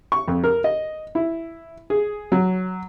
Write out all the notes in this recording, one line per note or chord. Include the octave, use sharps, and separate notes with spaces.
C#6
F2
A#4
D#5
E4
G#4
F#3